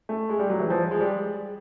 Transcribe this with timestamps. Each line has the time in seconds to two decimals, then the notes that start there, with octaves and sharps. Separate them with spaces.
0.09 A3
0.29 G#3
0.39 G3
0.50 F#3
0.60 E3
0.70 F3
0.91 G#3
1.01 G3